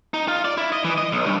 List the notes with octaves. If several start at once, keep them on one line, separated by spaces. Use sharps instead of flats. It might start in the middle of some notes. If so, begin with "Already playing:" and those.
D#4
F4
D5
E4
D#5
E3
D#5
B1
G2